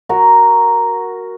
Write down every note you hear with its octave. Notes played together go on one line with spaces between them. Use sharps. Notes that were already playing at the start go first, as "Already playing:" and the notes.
F#4 A#4